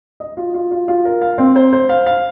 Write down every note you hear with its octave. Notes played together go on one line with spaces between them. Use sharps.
D#5
F4
F4
F4
F4
A#4
F5
C4
C5
C5
F5
F5